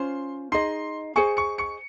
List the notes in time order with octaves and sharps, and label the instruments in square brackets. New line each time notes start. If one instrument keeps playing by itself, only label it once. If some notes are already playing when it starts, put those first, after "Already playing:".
Already playing: [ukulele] C#4 F4 C5 [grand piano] C6
[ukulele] D#4 G#4 D#5 [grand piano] C6 C7
[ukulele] G#4 C5 D#5 G#5 [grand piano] C#6 C#7
[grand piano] C#6 C#7
C#6 C#7